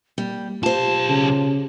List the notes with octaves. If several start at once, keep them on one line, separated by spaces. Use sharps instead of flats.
G3 A#3
B1 F4 G4 C5 A5
C#3